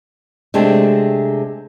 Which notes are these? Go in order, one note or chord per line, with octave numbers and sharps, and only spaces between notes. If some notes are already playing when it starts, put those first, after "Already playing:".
C3 G#3 A3 C4 D4